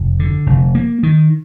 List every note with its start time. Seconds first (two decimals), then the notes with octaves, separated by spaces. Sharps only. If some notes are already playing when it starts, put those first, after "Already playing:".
Already playing: F1
0.19 D3
0.46 F1
0.75 A#3
1.03 D#3